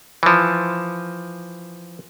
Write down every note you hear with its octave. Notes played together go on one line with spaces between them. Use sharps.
E3 F3